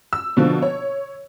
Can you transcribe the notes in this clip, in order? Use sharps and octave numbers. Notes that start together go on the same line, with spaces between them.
E6
B2 D3 F3
C#5